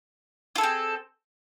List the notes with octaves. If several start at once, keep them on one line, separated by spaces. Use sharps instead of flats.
C4 F4 G#4 A4